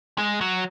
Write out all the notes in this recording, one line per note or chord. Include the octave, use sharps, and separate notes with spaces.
G#3
F#3